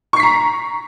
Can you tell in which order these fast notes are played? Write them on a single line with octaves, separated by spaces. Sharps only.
C#6 C7 B6 A#5